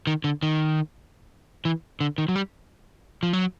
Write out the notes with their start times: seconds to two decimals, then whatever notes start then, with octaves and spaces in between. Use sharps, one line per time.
0.07 D#3
0.24 D3
0.43 D#3
1.65 E3
2.01 D3
2.18 D#3
2.28 F#3
2.36 G3
3.23 F3
3.33 F#3